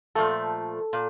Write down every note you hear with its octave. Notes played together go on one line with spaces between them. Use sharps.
A#2 F3 A3 A4
A#2